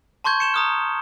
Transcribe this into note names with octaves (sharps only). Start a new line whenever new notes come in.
A5 C6 C#6 G6 G#6
C#7 E7 G7
A#5 D#6 F6